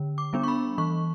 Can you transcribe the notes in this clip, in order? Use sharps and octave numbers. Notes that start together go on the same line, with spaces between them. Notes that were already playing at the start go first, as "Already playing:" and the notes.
Already playing: D3
D6
G3 B3 D4
C#6
B5
E3 C#6